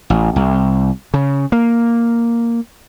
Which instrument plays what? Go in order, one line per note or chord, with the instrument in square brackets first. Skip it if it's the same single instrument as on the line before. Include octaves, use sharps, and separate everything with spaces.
[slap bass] A1
C2
C#3
A#3